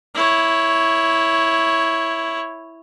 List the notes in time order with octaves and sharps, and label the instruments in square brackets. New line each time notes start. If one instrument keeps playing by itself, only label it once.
[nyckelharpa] E4 C#5